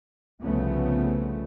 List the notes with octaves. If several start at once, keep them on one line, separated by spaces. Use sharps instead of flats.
C2 C#3 F3 A3 B3